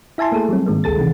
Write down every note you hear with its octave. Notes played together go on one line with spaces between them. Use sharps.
E4 E5 G#5 A5 C6
A3 A#3 G#4 A4
F#3 G3 C4
G#2 D#3 G#3 A#3
A1 D2 G#4 A4 A6
C3 D#3 E3